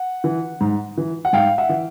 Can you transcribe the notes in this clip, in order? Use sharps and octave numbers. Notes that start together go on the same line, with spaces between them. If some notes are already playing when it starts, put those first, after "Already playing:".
Already playing: F#5
E3
G#2
E3
F#5
G#2 F5 G5
E5 F#5
E3